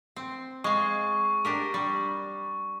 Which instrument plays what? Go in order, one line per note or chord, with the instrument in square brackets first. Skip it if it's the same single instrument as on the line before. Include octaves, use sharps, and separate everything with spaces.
[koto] C4
[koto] G#3 F5 [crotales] C#6
[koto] D4 G4 A#4
G3